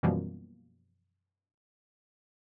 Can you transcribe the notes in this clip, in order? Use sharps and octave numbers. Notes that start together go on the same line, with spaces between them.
F#2 B2 E3 F3 G3 A#3